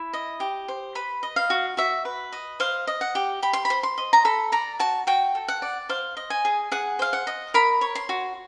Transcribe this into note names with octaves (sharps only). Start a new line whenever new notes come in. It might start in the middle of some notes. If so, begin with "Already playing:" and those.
Already playing: E4
D#5
G4
C5
B4 B5
D#5
F5
F#4
F#4 E5
B4
D#5
C5 F5
D#5
F#5
G4
G4 B5
C6
B5
C5
C6
D#5
A#5
A4 B5
D5 A#5
F#4 A5
F#4 G5
A4
F#5
D5
C5 F5
D#5
G#5
G#4
G#4 F#5
C5 F5
F#5
D#5
A#4 B5
C#5
C6
F#4